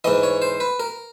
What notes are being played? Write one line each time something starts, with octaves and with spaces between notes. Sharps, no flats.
G#2 E3 D#5
C#5
C5
B4
A#4